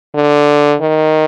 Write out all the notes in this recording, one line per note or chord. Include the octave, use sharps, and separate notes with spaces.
D3
D#3